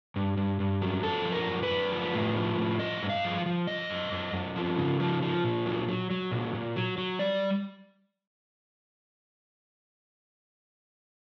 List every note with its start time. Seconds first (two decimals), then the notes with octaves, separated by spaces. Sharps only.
0.16 G2
0.37 G2
0.60 G2
0.82 F#3
1.03 F#2 A4
1.25 F3
1.32 A#4
1.48 F#2
1.63 B4
1.70 F#2
1.92 F3
2.14 A2
2.36 F3
2.58 A2
2.79 F3 D#5
3.02 G2
3.10 F5
3.24 F3
3.46 F3
3.67 F#2 D#5
3.90 F#2
4.12 F#2
4.33 F#2
4.56 F3
4.78 C#3
5.00 F3
5.22 F3
5.44 A#2
5.66 F#3
5.88 F#3
6.10 F#3
6.32 A#2
6.55 A#2
6.76 F#3
6.98 F#3
7.19 G3 D5